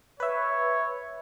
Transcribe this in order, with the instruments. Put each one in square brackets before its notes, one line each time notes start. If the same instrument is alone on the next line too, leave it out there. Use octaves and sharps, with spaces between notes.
[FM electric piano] B4 E5 [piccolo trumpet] C#5